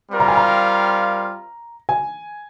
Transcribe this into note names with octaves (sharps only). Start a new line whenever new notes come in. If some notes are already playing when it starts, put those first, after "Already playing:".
G3 C4 F4 A#4 F5
A#5
G#5
A#5
G#5